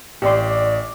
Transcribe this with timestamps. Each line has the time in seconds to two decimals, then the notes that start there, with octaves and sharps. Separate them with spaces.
0.22 A1 G4 D5 C6 D6